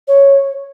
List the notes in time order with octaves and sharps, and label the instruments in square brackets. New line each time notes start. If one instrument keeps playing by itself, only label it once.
[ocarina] C#5